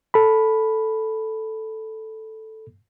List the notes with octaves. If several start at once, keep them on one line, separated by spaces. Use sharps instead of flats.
A4 B5